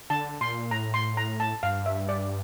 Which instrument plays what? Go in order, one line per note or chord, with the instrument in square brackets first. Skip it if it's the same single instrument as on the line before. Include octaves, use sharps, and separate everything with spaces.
[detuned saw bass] D3 [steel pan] A5
[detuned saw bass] A#2 [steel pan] C6
[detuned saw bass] A2 [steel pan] A#5
[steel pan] C6
A#5
A5
[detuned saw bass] G2 [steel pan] F5
[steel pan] E5
D5